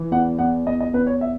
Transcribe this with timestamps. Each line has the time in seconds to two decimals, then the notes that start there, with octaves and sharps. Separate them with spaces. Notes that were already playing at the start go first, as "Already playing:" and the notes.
Already playing: E3
0.12 E2 F#5
0.39 E2 F#5
0.67 E2 D#5
0.80 D#5
0.93 E2 B4
1.07 C#5
1.21 E5